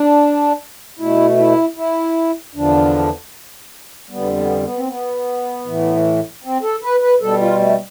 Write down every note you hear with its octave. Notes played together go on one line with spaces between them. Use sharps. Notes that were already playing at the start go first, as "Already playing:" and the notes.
Already playing: D4
B2 A3 E4
E4
E4
E2 D3 F3 D4
F2 D3 G3 B3
B3
B3
C4
B3
A2 E3 A3
C4
A4
B4
B4
B2 G3 A4
F4
A3